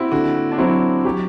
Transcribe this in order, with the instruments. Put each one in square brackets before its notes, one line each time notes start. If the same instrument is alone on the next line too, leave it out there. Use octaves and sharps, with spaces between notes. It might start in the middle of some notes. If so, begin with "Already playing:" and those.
Already playing: [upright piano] C4 E4 F#4 G4
[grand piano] D3 [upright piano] F#4
[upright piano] D4
[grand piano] F#3 C4 [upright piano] E4
[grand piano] F#3 [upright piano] G4